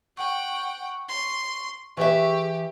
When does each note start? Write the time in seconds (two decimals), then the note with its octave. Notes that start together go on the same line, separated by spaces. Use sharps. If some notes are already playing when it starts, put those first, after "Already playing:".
0.17 F#5 G5 C#6
1.09 C6
1.97 E3 G4 G#4 E5 C#6